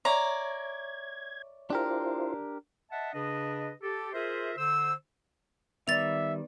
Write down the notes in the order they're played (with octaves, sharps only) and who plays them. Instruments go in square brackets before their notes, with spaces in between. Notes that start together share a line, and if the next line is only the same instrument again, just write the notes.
[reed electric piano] C#5 E5 C#6 [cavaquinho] D5 A#5 [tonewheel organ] G#6
[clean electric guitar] D4 G4 A#4 [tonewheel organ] E4 F4 C5
[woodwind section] D#5 E5 F#5 A5
C#3 D4 B4 D#5
G4 A4
F4 G#4 A#4 C5 E5
D3 C5 E6
[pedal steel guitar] D#3 G3 [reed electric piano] B3 B4 D5 [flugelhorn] E5 [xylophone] A6 F7